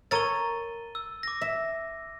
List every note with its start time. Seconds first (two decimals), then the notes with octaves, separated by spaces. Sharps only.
0.11 A4 A#4 C#5 A6 D#7 G7
0.95 E6
1.23 D6 A#6
1.41 E5